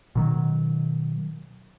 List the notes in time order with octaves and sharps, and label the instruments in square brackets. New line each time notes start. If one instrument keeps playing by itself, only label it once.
[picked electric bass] B2 D#3 F#3